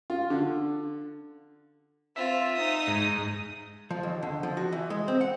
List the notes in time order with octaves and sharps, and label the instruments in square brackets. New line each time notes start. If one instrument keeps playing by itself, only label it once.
[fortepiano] F4
D3
[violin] C4 F4 [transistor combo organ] E5
[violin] D#4 D#6
[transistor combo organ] G#2
[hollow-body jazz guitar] F3
D#2
D3
F3
F#4
E3
G#3
C4
F#5